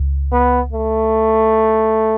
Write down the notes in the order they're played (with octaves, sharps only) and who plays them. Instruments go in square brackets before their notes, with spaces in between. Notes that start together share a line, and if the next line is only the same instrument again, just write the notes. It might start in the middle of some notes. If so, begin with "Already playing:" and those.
Already playing: [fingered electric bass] C#2
[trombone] B3
A3